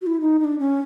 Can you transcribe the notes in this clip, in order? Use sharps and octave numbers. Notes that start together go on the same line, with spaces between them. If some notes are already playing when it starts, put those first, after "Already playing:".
F#4
E4
D#4
D#4
D4
C#4